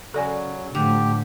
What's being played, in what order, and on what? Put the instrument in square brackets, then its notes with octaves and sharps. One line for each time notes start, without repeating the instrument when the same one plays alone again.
[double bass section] C#3 [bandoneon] F#3 [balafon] A4 D5 G#5
[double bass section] A2 F3 A3 [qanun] D3 [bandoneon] G4